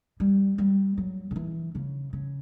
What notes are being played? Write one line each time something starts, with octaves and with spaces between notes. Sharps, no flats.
G3
G3
F#3
D3
E3
C#3
C#3